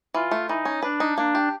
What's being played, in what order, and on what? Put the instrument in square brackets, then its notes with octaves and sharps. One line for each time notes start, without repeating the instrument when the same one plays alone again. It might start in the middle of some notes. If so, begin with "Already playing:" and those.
[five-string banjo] E3 [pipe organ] F4
[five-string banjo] A3
[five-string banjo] E3 [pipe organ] D#4
[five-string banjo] C#4
[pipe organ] D4 [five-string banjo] B4
[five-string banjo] D#4
[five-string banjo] A#3 [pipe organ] D4
[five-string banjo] G4